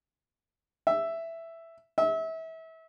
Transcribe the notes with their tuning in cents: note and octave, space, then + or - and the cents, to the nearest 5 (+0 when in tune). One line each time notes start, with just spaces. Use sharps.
E5 +5
E5 -30